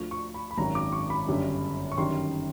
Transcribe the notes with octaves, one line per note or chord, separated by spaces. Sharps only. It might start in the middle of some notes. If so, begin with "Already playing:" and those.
Already playing: D2 D3 F3 C#6
C#6
B5
B5
G#1 F#2 D#3 F#3 A#5
D6
C#6
B5
G1 F#2 D3 G3
C#6
G1 F#2 D#3 G3 C6